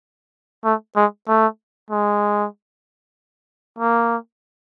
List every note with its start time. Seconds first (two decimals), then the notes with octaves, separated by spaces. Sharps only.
0.65 A3
0.96 G#3
1.28 A3
1.90 G#3
3.79 A#3